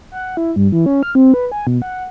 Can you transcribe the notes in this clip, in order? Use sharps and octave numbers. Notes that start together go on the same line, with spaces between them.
F#5
E4
G2
E3
C#4
F6
C4
B4
G#5
B2
F#5